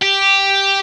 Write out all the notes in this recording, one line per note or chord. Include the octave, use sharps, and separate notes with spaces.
G4